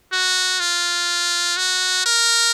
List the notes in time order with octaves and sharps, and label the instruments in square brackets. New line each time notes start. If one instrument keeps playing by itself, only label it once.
[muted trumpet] F#4
F4
F#4
A#4